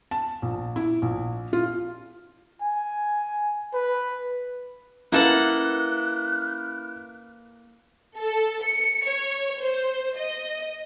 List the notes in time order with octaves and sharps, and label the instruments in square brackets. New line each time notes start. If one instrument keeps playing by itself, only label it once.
[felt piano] A5
A#1
E4
A#1
F4
[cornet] G#5
B4
[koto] A#3 A4 F#5 [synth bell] C#4 [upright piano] E4 B4 [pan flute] F#6
[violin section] A4
C#7
C#5
C5
D#5